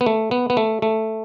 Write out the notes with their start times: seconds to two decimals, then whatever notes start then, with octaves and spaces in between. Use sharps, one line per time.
0.01 B3
0.06 A3
0.31 B3
0.50 B3
0.57 A3
0.82 A3